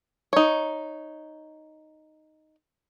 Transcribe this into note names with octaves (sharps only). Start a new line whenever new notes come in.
D#4 C#5